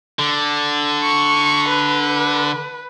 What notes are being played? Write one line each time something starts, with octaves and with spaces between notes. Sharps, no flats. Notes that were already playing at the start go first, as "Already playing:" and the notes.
D3
C#6
B4